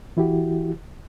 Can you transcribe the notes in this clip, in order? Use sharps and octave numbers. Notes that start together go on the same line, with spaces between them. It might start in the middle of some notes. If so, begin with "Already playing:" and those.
E3 E4 F#4 G4